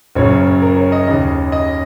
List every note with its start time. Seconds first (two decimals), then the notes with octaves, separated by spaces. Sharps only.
0.15 F#1 F#2 C#3 C#5
0.62 A#4
0.77 C#5
0.92 D#5
1.07 D#2 C#3 D#5
1.52 D#5